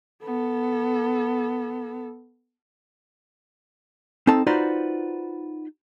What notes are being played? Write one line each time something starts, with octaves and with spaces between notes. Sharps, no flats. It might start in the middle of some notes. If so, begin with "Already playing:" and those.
B3 A4
C4 D#4 A4 A5
D#4 F4 F#4 B4 C5 D5